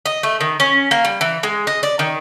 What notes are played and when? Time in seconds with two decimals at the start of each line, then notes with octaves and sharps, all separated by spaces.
0.06 D#5
0.23 A3
0.41 D#3
0.60 C#4
0.91 A#3
1.05 G3
1.21 E3
1.43 G#3
1.67 D#5
1.83 D5
1.99 D#3